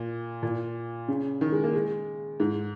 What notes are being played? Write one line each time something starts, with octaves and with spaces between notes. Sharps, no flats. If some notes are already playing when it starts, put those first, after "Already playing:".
Already playing: A#2
A#2
C#3
D#3
G#3
A#3
G#3
G#2